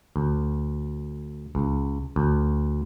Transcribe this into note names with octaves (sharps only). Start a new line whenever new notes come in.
D2
C#2
D2